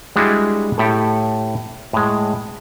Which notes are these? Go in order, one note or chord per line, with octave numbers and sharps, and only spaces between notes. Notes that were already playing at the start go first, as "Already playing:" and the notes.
G3 G#3 D4 E4 F#4 G#4
A2 G4 A4
A2 G#3